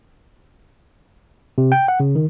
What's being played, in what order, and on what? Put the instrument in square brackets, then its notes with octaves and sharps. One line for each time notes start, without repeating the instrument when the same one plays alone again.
[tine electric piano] C3
G5
F#5
C#3
D#3